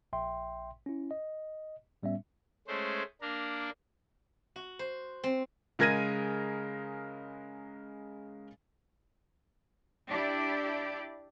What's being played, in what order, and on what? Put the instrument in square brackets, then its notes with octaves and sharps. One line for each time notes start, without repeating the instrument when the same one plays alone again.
[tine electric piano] A#1 E5 G5 C6
C#4 E4
D#5
A2 G3 B3 C#4 E5
[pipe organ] G#3 A3 C#4 C5
A#3 D4 A#4
[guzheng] F#4
C5
C4
[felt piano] C#3 G#3 A#4 G#6 A#6 D#7
[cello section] D4 E4 G4 D5